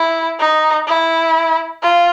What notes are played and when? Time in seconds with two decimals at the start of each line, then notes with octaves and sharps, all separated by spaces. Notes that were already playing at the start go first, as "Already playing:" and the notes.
Already playing: E4
0.40 D#4
0.87 E4
1.83 F4